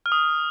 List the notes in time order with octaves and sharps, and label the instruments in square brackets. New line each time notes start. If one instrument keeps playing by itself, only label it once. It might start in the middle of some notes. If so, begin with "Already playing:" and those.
[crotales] F6
D#6